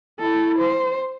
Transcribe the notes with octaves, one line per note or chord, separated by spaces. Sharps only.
E4 A4
C5